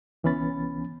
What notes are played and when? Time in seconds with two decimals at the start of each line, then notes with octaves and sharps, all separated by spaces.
0.24 C2 E3 B3 C#4 B5 A6